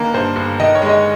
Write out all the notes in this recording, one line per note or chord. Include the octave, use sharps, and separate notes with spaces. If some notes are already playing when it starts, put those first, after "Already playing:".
Already playing: G1 G2 D#3 A#3
G2 C5
G1
D#3 D#5
C#5
G#3
D#5